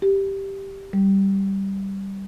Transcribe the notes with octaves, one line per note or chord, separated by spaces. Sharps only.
G4
G3